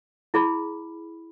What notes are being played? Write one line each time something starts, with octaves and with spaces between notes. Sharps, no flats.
E4 G#4 B5